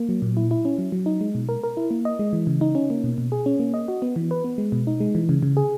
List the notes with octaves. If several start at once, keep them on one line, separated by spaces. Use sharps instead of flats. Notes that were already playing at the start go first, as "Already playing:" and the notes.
Already playing: A#3
F#3
A#2
E4
E4
C#4
F#3
F#3
D#4
G#3
B2
A#4
A#4
E4
A#3
D#5
G#3
E3
C#3
D#4
C#4
A#3
B2
B2
G#4
C#4
A#3
D#5
F#4
B3
E3
B4
B3
G#3
B2
D#4
G#3
E3
C#3
C#3
G#4